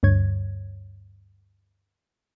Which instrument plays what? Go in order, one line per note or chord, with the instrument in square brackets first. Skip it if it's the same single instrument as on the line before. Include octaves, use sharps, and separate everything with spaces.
[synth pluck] D2 G2 C#5 G#6